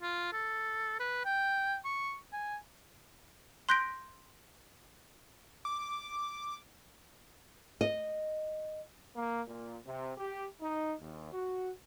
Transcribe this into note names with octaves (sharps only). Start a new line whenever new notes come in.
F4
A4
B4
G5
C#6
G#5
C6 F#6 G6 A#6 B6 D7
D6
D#5
A#3
A#2
C3
G4
D#4
D#2
F#4